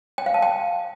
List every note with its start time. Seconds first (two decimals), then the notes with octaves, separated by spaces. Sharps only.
0.18 G5
0.26 F5
0.34 A5
0.42 G5